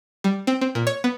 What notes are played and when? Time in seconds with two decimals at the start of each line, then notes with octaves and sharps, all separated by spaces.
0.24 G3
0.47 C4
0.61 C4
0.75 A#2
0.87 C#5
1.04 B3